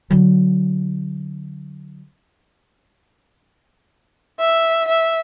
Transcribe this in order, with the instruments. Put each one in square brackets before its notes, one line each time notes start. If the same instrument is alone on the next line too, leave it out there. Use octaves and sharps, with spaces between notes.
[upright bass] D3 F#3
[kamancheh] E5
E5